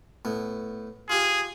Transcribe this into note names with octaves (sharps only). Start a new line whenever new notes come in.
A2 B3
F4 G4 G#4